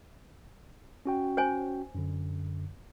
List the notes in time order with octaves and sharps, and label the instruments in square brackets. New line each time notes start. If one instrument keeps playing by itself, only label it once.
[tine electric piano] C#4 F#4 G5
[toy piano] C5 C#5 G#5
[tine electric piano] F#2 D3